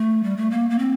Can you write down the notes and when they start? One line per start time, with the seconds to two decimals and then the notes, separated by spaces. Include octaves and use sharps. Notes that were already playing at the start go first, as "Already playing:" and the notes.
Already playing: A3
0.24 G3
0.37 A3
0.51 A#3
0.70 A#3
0.79 C4